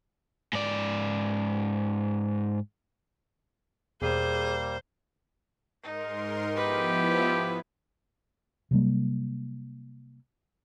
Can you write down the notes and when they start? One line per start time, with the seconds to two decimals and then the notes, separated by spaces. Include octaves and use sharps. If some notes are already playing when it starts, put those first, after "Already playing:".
0.53 G#2 D5
4.02 E2 B2 G3 A#3 G#4 C5
5.83 G#2 D#4 A#4 C6
6.56 F3 B3 E4 G4 B4
8.71 C3 F#3 G3 A#3